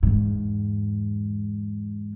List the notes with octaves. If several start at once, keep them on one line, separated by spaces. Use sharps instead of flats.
E2 G#2